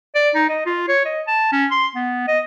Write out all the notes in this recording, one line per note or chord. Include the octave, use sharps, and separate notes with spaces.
D5
D#4
D#5
F4
C#5
D#5
A5
C#4
C6
B3
D#5